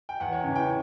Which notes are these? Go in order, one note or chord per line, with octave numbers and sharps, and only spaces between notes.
G5
E2 F#5
C#5
C#3 E3
G5